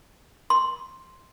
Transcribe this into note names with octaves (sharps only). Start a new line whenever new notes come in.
C6